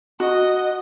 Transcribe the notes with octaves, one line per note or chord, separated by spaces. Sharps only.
F#4 D#5